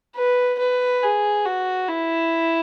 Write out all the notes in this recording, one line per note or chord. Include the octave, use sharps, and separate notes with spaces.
B4
B4
G#4
F#4
E4